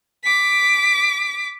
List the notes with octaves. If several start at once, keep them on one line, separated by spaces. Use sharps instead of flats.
D6 B6